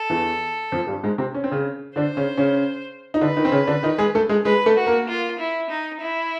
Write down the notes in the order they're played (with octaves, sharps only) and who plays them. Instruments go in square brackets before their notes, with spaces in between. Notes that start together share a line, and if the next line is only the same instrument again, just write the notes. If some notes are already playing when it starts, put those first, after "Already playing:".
Already playing: [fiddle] A4
[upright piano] E2 E3
F2 F3
G2 G3
G#2 G#3
C3 C4
C#4
C4
C#3 C#4
[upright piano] D3 D4 [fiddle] C5
[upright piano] C#3 C#4
C#3 C#4
D#4
[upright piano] D3 D4 [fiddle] B4
[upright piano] D#3 D#4
C4
C#3 C#4
D3 D4
D#3 D#4
G#3 G#4
A3 A4
G#3 G#4
[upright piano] G#3 G#4 [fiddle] B4
[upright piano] A3 A4
[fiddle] F#4
[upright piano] A#3 A#4
[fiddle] F4
E4
D#4
E4